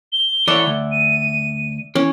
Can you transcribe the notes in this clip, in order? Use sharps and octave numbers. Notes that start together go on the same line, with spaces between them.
G7
E3 A4 C#5 D5 E5 F#5
D2
D#7
E3 C#4